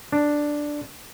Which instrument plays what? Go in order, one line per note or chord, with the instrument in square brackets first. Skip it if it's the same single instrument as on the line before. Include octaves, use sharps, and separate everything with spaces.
[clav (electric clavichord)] D4